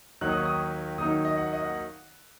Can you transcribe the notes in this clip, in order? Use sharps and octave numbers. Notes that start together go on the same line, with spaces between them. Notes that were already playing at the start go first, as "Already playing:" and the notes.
D#2 D#3 F#3 D#4 F#6
D#6
C#6
D#6
D#2 D#3 F#3 D#4 D#6
D#5
F#5
D#5
F#5